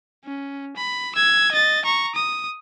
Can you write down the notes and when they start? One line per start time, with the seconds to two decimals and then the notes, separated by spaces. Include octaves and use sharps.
0.24 C#4
0.76 B5
1.15 E6 G#6
1.51 D#5 A6
1.85 A#5 C#6
2.15 D#6